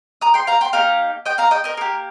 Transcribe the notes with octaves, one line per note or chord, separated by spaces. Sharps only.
A#5 D#6
G5 C6
F5 A#5
G5 C6
A#3 D#4 G4 F5 A#5
D#5 G5
F5 A#5
D#5 G5
A#4 D#5
A#3 G4 A#4